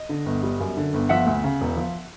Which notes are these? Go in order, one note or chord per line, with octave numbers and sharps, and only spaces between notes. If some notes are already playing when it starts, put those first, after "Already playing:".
Already playing: D#5
D3
G1
G3
F#2
D3
G1
F3 E5 F#5
D2
C#3
E1
F3